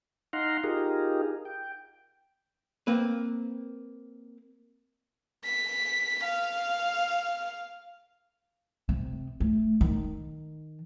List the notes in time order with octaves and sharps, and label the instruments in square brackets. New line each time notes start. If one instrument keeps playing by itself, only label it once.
[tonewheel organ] D#4 F5 F#5 A#5 C6
D#4 F4 G4 G#4 A#4
G5
[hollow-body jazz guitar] A#3 C4 B4
[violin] B6
F5
[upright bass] C3
A3
D#3